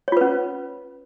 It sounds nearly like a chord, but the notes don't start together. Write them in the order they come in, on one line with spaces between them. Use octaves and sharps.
C#5 F4 B4 C#4